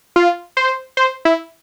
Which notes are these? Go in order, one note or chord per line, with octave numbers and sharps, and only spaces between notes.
F4
C5
C5
E4